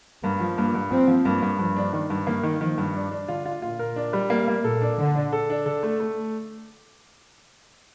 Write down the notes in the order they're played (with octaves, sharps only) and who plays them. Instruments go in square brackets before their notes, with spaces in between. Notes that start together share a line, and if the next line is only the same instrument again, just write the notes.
[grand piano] G2 [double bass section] A#3
[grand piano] F3
[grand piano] G2 [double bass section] A#3
[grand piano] G2
[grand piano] F3 [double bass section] C4
[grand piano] F3
[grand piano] G2 [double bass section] A#3
[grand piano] G2
[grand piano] G2 [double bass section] F3
[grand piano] D4
D#3
G2
[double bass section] D#3 [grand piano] A#3
[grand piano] D#3
[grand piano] D#3 [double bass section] F3
[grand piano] G2
D4
D4
[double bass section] D3 [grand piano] F4
[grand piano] F4
[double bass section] A#2 [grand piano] F4
[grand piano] A#4
D4
G3
A#3
A#3
[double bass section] A#2 [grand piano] A4
[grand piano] D4
[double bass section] D3 [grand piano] D4
[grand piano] D4
A4
D4
[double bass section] D3 [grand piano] A4
[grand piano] A3
A3